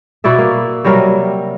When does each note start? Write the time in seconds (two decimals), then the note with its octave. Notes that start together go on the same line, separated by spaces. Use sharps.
0.24 B2 E4 D5 E5
0.38 A#3
0.84 C3 F#3 G3 A#4